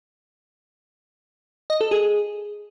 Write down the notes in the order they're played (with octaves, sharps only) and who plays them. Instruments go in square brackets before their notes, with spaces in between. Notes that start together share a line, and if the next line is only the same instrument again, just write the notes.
[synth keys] D#5
A4
G#4